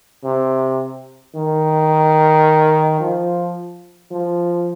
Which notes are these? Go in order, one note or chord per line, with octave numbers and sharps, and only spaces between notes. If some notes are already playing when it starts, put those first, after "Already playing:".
C3
D#3
F3
F3